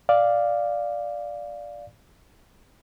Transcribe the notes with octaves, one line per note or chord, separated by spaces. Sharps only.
D5 F5